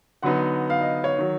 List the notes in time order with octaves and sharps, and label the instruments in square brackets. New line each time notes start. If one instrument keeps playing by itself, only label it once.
[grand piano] D3 F#3 B3 D#4 [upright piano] F#5
[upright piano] F5
D#5
C#5
[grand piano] D#3 F#3